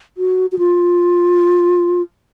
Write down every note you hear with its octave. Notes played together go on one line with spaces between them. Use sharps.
F#4
F#4
F4